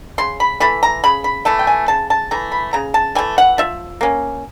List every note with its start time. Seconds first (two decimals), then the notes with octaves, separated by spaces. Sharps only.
0.18 C#3 C6
0.40 B5
0.60 E3 A3 B5
0.83 A#5
1.04 C#3 B5
1.24 B5
1.45 E3 A3 A5
1.59 G5
1.67 G#5
1.88 C#3 A5
2.10 A5
2.31 E3 A3 A#5
2.52 B5
2.73 C#3 A#5
2.94 A5
3.15 E3 A3 G#5
3.38 F#5
3.58 F3 E5
4.01 A#3 C#4